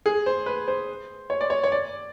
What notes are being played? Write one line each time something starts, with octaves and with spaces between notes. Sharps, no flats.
G#4
C5
B4
C5
C#5
D5
C#5
C#5
D5